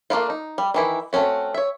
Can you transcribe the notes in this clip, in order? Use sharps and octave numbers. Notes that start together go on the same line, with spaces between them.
A3 A#3 D4 E4 F4
D#4
G3
D#3 E3 E4
A3 C4 C#4 F#4
C#5 E5